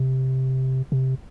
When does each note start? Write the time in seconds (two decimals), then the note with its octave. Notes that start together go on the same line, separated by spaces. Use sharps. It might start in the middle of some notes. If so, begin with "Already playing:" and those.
Already playing: C3
0.92 C3